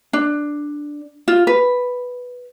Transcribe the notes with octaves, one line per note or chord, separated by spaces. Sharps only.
D4
F4
B4